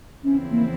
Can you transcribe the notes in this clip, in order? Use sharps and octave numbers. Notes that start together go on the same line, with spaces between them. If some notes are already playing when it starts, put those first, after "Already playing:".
E2 C#3 F3 C4 C#4 E4
A#3